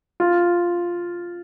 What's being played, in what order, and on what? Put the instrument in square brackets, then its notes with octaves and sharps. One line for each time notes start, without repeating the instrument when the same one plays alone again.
[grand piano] F4